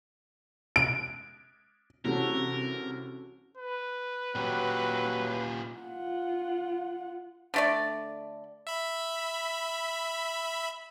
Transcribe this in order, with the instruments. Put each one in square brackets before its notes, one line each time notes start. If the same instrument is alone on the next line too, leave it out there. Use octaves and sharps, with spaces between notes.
[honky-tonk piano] D7
[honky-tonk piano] C2 C3 E3 [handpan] C#4 F#4 A4 [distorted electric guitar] A#4
[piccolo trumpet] B4
[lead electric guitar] A#2 G4 [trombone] F#3
[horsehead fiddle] F4 F#5
[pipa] D3 A3 D5
[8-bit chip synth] E5 B5